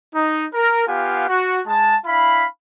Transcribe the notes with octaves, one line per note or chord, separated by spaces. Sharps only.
D#4
A#4
B3 F4 G4 F5 F#5 G#5
F#4
G#3 A5
D4 E4 F5 B5